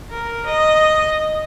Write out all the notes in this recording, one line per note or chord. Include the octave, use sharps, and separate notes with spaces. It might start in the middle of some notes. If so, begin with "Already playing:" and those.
A#4
D#5